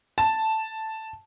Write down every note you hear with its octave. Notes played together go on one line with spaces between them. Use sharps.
A5